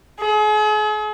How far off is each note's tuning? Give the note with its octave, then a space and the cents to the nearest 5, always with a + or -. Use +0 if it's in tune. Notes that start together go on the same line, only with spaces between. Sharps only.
G#4 +40